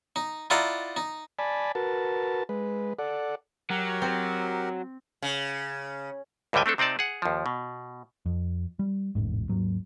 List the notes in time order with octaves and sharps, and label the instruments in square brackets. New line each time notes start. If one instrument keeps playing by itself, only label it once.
[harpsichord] D#4
E4 F4 D5 D#5 F#5 A#5
D#4
[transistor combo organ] D5 G#5 A5 B5
F#4 A#4 B4 A5
G#3 B4
A4 D5 F#5
[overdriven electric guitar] F#3 [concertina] G4 A#4 F#5
[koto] C4
[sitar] C#3
[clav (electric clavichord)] C#2 G2 D3 G3 G5 G#5
A3 C4 D4 A4
C3 C4 D#4 D5 A5
G#4 F#5
D#2 F3
B2
[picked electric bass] F2
G3
E1 A1 G#2
D#2 G#2 F#3